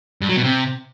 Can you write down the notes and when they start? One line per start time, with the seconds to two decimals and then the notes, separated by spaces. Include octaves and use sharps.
0.21 G2
0.29 F#3
0.36 B2
0.44 C3